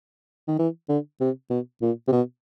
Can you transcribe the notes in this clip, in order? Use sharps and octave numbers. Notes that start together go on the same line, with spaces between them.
D#3
E3
D3
C3
B2
A#2
C3
B2